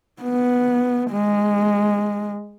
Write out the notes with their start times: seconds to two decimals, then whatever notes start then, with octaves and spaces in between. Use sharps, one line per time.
0.22 B3
1.11 G#3